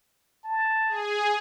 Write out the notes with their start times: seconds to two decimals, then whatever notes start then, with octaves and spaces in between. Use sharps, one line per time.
0.45 A5
0.88 G#4